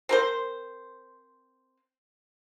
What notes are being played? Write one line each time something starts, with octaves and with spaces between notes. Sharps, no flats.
C4 A#4 C5